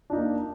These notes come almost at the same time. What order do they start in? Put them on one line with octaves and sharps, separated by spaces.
D4 D#4 A#3